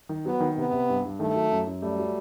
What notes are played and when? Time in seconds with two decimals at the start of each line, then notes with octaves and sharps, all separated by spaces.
0.09 D#3
0.26 F#3 B3
0.40 D#3
0.57 C3 B3
0.72 C3
0.89 G2
1.05 G2
1.20 D#3 A3
1.36 F#3
1.52 F#2
1.67 F#2
1.82 G3 A3
1.99 F#3